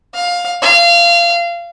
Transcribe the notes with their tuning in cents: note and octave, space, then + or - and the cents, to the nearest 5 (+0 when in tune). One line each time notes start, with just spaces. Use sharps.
F5 +15
F5 -25